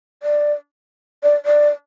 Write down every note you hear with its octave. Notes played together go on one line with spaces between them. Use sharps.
D5
D5
D5